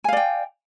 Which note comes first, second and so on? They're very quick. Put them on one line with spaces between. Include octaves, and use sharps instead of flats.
G#5 F5 D5 G5